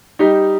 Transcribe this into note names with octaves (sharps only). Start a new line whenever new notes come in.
G3 D#4 G4